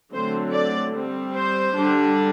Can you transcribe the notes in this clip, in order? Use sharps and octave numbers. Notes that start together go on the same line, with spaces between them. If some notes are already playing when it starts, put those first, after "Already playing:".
D3 F#3 A3 C4 C5
D5
G3 C4
C5
D3 G3 D4